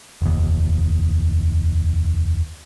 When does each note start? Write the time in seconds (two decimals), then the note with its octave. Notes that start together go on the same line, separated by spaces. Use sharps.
0.22 F1 D#2